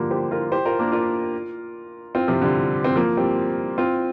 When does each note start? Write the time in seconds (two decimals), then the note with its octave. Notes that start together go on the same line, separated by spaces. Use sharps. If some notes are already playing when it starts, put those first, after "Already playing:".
Already playing: D3 F3 G3 A#3
0.11 G4 C5
0.31 F4 A#4
0.52 G4 C5
0.65 F4 A#4
0.79 A#3 D4
0.92 F4 A#4
2.15 C4 F4
2.28 C3 F3
2.42 D3 G3
2.84 C4
2.96 F3 A#3
3.17 G3 C4
3.78 C4 F4